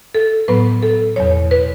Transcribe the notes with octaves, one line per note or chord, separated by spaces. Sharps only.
A4
A2 F#3 B3 B4
A4
E2 B2 F#3 C#5
B4